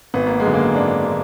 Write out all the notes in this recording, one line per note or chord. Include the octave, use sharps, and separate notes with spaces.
G#1 B3
A#3
G#3
F#2 D3
A#3
G#1 D4
D3